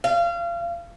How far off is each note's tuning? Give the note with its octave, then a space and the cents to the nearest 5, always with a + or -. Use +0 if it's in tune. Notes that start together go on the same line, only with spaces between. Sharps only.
F5 -30